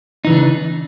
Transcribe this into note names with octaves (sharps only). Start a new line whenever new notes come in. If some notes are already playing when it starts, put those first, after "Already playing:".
C#3 E3 D4 D#4